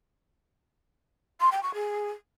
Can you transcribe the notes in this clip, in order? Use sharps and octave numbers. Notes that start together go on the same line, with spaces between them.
C6
G5
C#6
G#4